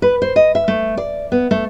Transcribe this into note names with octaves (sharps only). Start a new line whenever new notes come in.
B4
C5
D#5
E5
A3
D5
B3
A3